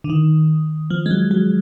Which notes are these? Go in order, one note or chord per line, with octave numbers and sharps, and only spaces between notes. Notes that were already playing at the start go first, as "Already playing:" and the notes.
D3
D#3
F3
G#3
F#3
F#3